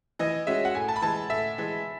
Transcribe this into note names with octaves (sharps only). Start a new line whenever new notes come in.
E3 D#5
G#3 C#4 F#4 E5
F#5
A2 G#5
A5
B5
E3 G#3 A5
A2 E5
E3 G#3